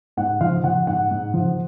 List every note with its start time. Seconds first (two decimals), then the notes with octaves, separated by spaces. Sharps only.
0.17 G#2 F#5
0.41 F3 F5
0.64 F3 F#5
0.87 G#2 F#5
1.11 G#2
1.34 F3